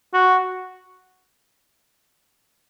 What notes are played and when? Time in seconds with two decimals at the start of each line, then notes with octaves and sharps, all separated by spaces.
0.14 F#4